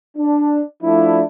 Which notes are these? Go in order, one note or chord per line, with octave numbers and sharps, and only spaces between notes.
D4
F3 A3 D4 E4